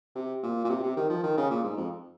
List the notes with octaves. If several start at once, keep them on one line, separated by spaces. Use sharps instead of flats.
C3
A#2
A#2
C3
C3
D#3
F3
D#3
C#3
A#2
G#2
F2